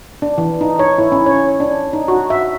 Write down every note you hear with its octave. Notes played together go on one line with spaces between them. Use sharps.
D4
E3
D#4
C#5
E4
C#4
C#5
D4
D#4
F#4
E5